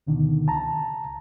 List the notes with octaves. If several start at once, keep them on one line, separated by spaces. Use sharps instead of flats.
D2 B2 D3 D#3
C#2 A5 A#5